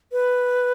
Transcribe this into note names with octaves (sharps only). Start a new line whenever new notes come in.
B4